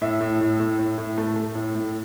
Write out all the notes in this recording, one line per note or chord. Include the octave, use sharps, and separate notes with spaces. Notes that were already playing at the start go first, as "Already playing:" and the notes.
A2 E5
A2
A2
A2
A2
A2
A3
A3
A2
A2